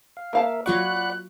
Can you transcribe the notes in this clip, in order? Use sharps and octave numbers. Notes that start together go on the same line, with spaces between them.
F5
A#3 A#4 E5 F5 A5
F#3 F4 D5 F#5 B5 C#6 F#6